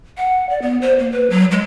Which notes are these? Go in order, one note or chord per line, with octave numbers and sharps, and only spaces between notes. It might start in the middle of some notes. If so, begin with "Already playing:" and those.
F#5
D5
B3
C5
A#3
B4
F#3
G#3